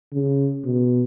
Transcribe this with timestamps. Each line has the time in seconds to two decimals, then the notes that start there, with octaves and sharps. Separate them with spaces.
0.13 C#3
0.65 B2